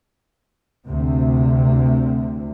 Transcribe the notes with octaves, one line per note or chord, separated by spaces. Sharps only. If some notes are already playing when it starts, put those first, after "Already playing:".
D2 C3